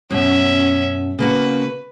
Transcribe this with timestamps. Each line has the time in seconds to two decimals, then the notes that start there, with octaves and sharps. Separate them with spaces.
0.10 F#2 B2 C#4 E5
1.19 C#3 A#3 F#4 B4